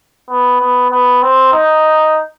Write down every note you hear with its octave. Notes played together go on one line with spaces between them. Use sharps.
B3
B3
B3
C4
D#4